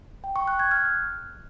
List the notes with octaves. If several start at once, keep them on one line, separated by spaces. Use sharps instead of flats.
G5
C#6
F#6
G#6
F6